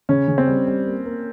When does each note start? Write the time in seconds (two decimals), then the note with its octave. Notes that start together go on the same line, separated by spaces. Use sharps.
0.09 C#3 C#4
0.28 C#3
0.38 C4
0.48 G3
0.67 G3
0.87 A#3
1.06 A#3